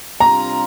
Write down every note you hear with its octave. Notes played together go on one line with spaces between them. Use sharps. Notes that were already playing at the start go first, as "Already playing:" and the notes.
C3 G3 D4 F4 A#5